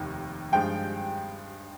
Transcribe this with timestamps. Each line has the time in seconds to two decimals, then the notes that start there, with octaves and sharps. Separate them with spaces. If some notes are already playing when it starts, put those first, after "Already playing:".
Already playing: F1 D#2 D#3
0.52 G2 F3 G#3 G5